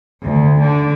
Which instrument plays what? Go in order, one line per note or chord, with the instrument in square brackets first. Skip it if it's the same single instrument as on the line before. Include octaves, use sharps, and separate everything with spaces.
[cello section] D2
D3